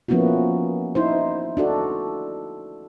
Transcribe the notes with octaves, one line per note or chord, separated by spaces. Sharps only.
F3 A#3 B3 C#4 E4 F#4
D#4 E4 C5
D4 F#4 A4